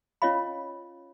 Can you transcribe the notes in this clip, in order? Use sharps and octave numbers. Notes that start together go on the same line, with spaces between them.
C#4 F4 C#5 D#5 F5 B5